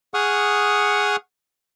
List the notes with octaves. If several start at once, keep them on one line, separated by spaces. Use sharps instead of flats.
G#4 F#5 C#6 D#6 F6